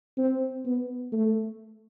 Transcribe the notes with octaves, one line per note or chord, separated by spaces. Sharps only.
C4
B3
A3